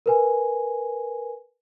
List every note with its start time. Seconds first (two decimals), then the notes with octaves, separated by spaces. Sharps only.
0.06 A#4 B4 G#5